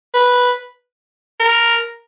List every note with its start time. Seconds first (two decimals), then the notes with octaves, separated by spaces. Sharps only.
0.14 B4
1.40 A#4